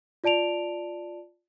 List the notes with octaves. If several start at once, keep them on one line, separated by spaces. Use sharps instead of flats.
F4 D5 A5 D7 F7